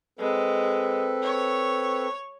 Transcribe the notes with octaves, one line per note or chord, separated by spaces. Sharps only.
G#3 C4 A4 B4
C#5